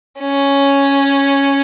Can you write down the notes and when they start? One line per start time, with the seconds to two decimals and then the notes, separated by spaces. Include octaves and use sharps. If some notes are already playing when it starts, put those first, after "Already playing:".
0.20 C#4